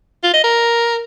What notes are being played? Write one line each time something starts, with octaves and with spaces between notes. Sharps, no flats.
F4
D#5
A#4